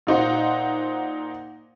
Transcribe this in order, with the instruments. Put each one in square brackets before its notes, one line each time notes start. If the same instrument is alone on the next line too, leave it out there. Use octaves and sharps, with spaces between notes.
[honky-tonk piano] A#2 D#4 C5 F#5